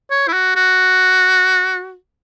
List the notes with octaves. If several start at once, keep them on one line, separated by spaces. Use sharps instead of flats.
C#5
E4
F#4
F#4